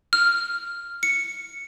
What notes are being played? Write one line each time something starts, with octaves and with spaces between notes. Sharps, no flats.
F6
C#7